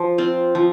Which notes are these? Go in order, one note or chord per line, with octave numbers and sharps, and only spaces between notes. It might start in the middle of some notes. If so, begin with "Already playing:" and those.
Already playing: F3
C4 F4
F3